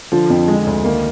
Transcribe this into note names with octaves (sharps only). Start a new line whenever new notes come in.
D3 F3
F2
D3 G#3
D2
D#3 A#3